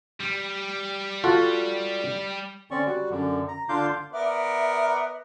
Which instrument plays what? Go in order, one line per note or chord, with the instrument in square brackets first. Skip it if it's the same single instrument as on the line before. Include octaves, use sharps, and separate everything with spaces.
[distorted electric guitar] G3
[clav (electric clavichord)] F4 F#4 A4
[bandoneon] D3 C4 C#4 D5 C#6
G3 F#4
F#2 D3
A#5
D3 D4 F4 F5 D6 G6
[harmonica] B3 A#4 D5 [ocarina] E5